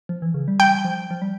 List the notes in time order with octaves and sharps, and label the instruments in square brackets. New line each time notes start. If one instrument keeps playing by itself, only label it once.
[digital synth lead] F3
E3
C#3
G3
[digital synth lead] G3 [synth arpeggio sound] G5
[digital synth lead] F3
F3
G3